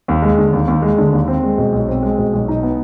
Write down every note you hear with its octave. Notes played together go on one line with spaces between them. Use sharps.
D#2
G#3
D3
D#2
D#2
G#3
D3
D#2
C4
G#3
B2
B1
C4
G#3
B2
B1
D#4
B3